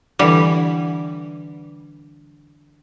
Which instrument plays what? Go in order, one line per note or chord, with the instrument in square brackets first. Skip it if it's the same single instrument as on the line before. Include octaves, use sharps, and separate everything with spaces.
[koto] D3 E3 G3